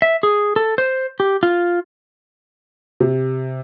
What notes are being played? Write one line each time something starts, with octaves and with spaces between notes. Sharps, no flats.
E5
G#4
A4
C5
G4
F4
C3